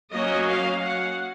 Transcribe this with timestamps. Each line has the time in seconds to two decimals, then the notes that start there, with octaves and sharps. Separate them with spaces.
0.12 F#3 A#3 C#4 D#5
0.48 F5
0.83 F#5